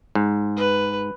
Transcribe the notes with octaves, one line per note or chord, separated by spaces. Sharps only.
G#2
B4